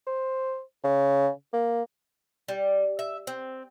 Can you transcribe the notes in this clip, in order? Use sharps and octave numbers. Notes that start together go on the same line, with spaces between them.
C5
C#3
A#3
G3
E5
C4